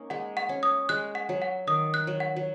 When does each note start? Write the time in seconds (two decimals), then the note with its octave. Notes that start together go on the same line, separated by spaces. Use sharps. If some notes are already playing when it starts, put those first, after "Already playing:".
Already playing: A#3 C#4 D#4
0.10 G#3 F#5
0.37 F#5
0.49 C#4
0.63 D#6
0.89 G#3 F#6
1.15 F#5
1.29 F#3
1.42 F#5
1.67 D#3 D#6
1.94 F#6
2.07 F#3
2.20 F#5
2.36 F#3